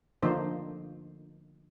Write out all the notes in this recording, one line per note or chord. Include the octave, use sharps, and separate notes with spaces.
D3 F3 A#3 D#4 C5